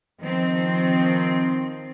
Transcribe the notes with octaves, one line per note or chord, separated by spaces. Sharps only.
D#3 F3 C4